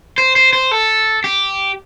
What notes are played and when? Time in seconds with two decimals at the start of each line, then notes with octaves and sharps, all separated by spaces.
0.18 C5
0.36 C5
0.53 C5
0.71 A4
1.24 G4